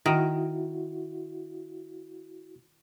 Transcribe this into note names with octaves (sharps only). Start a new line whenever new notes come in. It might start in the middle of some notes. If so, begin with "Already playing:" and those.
D#3 E4 F#4